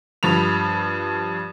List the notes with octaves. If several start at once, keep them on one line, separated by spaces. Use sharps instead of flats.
G2 F3 B5 F7